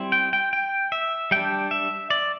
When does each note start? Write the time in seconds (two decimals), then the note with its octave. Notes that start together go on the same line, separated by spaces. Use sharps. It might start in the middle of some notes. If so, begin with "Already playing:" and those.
Already playing: G3 C4 E4
0.12 G5
0.33 G5
0.53 G5
0.92 E5
1.31 G3 D4 G5
1.71 E5
2.10 D5